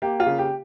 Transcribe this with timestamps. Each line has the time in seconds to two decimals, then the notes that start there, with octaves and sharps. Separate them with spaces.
0.02 A#3 G4
0.20 F4
0.26 C#3
0.38 G4